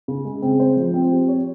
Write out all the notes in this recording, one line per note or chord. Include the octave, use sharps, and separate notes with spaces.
C#3
G#3
C4
C5
F3
C4
G4
C#5